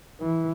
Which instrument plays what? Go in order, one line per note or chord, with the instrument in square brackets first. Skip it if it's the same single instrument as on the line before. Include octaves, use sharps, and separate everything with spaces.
[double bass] E3